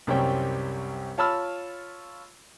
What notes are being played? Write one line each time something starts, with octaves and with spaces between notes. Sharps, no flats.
C2 F#2 G3 C4 C#5 G5
F4 C#5 A5 B5 E6 F6